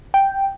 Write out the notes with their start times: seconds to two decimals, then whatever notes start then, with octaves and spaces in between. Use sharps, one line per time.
0.14 G5